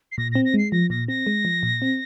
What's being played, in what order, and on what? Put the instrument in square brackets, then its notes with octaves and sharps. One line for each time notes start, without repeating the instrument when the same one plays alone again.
[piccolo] C7
[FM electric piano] A#2 [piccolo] A#6
[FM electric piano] C4 [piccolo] A#6
[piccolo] A#6
[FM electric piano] G#3 [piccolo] C7
[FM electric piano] F3 [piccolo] A#6
[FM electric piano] A#2 [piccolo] A#6
[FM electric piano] C4 [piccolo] A#6
[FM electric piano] G#3
F3
A#2
C4